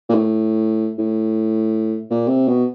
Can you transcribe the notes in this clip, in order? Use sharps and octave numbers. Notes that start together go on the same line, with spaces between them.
A#2
A2
A2
A#2
C3
B2